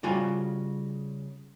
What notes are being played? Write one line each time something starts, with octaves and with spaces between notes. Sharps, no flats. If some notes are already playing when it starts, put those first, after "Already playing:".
C#3 G3 F4 F#4 G#5